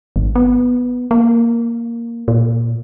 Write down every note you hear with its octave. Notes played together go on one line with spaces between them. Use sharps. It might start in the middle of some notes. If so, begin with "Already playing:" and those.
G#1
B3
A#3
A#2